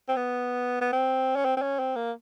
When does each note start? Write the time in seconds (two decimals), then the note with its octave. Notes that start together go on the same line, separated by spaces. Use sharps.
0.08 C4
0.16 B3
0.81 B3
0.93 C4
1.36 C#4
1.45 C4
1.57 C4
1.62 C#4
1.79 C4
1.96 A#3